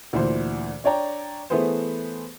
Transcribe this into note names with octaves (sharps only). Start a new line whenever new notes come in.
D2 A#2 E3 C5
D4 C#5 D5 G5 A#5
E3 A3 B3 G#4 B4 C5